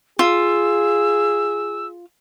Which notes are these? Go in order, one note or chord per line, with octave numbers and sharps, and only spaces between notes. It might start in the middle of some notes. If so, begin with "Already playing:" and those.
F4 G#4 E6